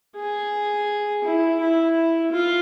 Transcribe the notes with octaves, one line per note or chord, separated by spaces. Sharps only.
G#4
E4
E4
F4